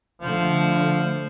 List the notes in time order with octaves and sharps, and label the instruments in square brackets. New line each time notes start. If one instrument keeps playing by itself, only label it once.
[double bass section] D3 A3 [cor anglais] F3